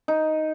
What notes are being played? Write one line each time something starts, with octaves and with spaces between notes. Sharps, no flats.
D#4